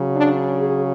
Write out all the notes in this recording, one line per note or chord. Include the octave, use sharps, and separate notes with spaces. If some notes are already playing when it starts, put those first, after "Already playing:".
Already playing: C#3 F#3
D4
G#4